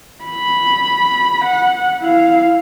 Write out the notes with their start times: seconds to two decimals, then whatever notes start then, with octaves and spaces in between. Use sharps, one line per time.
0.24 B5
1.45 F#5
2.02 E4 F5